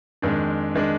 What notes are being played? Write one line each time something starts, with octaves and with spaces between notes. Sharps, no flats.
F2 D#3 G#3 D4
D#3 G#3 D4